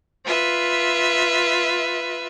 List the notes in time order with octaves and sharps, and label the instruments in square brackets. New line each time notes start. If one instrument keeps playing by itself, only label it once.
[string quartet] F4 B4 E5